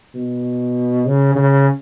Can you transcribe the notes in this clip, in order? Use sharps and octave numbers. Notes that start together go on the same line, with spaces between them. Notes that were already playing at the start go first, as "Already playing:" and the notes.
B2
C#3
C#3